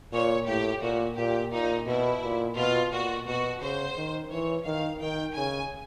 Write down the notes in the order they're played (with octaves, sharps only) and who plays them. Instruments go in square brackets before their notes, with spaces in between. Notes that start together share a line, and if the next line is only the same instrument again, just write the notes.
[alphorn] A#2 [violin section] C#5
[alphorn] A2 [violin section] G4
[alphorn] A#2 [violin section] F#4
[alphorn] A#2 [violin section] G4
[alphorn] A#2 [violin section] D#4
[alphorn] B2 [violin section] E4
[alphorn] A#2
[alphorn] B2 [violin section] F4
[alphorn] A#2 [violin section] F#4
[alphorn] B2 [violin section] F#4
[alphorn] C#3 [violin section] C5
[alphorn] D#3
[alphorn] E3 [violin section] C#5
[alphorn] D#3 [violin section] F5
[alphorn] D#3 [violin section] G5
[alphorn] C#3 [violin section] G#5